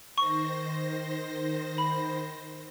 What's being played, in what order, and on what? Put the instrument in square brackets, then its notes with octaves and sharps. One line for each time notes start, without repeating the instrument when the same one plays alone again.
[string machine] D#3 C5 A#6 [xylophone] C#6
[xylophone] B5